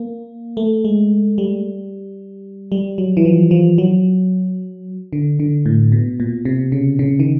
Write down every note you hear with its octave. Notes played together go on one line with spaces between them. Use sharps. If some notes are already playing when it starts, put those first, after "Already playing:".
Already playing: A#3
A3
G#3
G3
G3
F#3
E3
F3
F3
F#3
D3
D3
A2
B2
A#2
C3
C#3
C#3
D#3